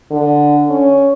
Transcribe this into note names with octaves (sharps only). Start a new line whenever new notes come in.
D3
C#4